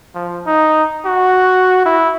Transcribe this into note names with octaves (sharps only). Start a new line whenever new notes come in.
F3
D#4
F#4
E4